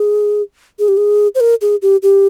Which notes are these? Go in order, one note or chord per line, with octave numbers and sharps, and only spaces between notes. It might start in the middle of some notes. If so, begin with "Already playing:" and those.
Already playing: G#4
G#4
G4
G#4
C5
A#4
G#4
G4
G4